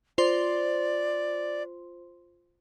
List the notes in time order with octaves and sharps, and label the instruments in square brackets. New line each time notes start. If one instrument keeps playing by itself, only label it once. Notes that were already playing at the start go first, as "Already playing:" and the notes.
[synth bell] F4 C5 C6 [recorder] D5